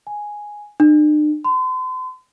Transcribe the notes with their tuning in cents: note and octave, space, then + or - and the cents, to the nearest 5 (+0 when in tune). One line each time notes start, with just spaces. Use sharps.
G#5 +0
D4 +45
C6 -40